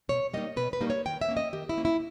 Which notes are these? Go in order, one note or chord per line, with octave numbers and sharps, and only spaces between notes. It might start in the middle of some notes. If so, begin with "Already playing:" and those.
B2 C#5
G3 A#3 D#4 D#5
B2 B4
B4
G3 A#3 D#4
C#5
D#3 G5
E5
A#3 C#4
D#5
D#3 G4
E4
A#3 C#4
E4